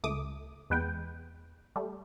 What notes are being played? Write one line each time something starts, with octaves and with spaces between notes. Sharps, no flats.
C#2 A3 D6 D#6
E2 G#3 B4 F#5 G5
G3 A3